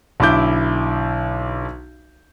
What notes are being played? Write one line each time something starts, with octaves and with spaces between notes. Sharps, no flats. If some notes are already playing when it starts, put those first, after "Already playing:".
B1 D3 E4 D6 G6